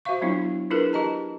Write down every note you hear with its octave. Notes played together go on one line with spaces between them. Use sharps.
F#4 C5 E5 F5 C#6
F#3 B3 D4 E4 F4
D4 E4 F4 G#4 A#4 B4
G4 A#4 D#5 A5 A#5